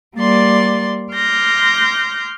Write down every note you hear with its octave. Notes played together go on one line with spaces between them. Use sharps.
G3 A#3 D5 C6 A6
C6 D6 F6 G6 A#6